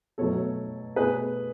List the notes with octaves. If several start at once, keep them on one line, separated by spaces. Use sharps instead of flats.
B2 F#3 A3 A4 C#5
B2 A3 G#4 B4